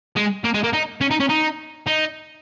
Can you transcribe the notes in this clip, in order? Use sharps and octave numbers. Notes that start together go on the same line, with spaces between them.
G#3
A#3
G#3
A#3
D#4
C#4
D#4
C#4
D#4
D#4